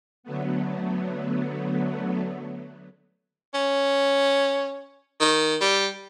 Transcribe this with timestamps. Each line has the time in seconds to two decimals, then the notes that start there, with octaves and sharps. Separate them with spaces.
0.23 D3 F#3 A3 B3
3.54 C#4
5.20 D#3
5.61 G3